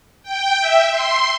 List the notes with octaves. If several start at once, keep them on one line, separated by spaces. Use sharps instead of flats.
G5
E5
C6